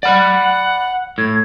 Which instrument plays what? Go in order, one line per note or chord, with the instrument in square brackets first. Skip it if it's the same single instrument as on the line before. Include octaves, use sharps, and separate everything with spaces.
[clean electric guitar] D5 B5 [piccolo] F#5
[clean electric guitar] A2 [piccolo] G#6